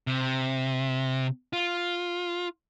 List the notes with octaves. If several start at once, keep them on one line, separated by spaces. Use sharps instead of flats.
C3
F4